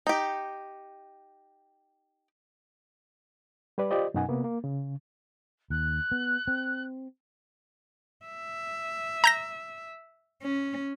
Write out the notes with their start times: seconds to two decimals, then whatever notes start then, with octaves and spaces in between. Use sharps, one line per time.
0.07 D#4 G4
3.78 G3 G4 B4 D5
3.91 F4 G4 C5 D5 D#5
4.14 F#2 B2 F#3 D#4 F#5 G#5
4.28 C3 A#3 B3
4.44 A#3
4.64 C#3
5.70 D#2 F#6
6.12 B3
6.48 C4
8.26 E5
9.24 A#5 G6 A#6
10.42 C#4